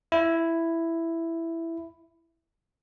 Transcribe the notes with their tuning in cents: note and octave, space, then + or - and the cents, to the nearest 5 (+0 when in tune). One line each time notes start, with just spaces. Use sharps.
E4 +5